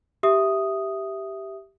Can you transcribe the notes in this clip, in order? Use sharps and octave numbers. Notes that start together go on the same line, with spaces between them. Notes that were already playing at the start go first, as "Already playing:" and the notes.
G4 E5 D#6